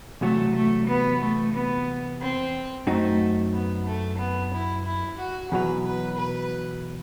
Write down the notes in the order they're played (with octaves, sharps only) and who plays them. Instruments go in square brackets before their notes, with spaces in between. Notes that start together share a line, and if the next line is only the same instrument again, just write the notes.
[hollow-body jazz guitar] E2 C3 F#3 [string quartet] A3
[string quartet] A3
B3
A3
B3
C4
[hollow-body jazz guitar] F#2 F#3 C4 D#4 [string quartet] A3
[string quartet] B3
A3
B3
E4
E4
F#4
[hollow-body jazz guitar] E2 B2 F#3 [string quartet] B4
[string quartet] B4
B4